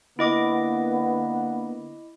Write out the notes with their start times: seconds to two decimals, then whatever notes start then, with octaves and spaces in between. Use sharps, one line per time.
0.19 D3 A#3 B3 E4 D#5 D6